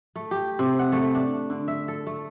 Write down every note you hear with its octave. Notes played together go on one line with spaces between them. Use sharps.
A3
G4
C3
F#5
A3
D4
D3
E5
A4
A3